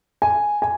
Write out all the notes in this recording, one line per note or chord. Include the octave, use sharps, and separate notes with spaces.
G#5
G#5